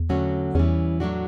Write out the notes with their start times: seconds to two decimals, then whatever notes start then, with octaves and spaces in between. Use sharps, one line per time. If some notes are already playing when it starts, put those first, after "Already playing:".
Already playing: E2
0.09 D3 F#3 A3 C#4 F#4
0.55 E2 E3 G3 C#4
1.00 A2 F#3 A3 D4 F#4